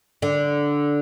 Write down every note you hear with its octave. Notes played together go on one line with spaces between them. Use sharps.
D3